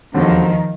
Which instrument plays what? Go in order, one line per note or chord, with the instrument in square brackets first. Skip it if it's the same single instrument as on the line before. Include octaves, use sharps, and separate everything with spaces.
[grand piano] E1 D#2 D3 G3 C4 [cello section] D#3 F3